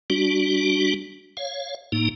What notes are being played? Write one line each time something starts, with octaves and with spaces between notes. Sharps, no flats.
G3 D4 F#4
C#5 F5
A2 A#3 D#4